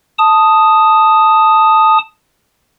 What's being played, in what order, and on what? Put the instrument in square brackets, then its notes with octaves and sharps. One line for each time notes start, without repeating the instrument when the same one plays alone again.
[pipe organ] A5 D#6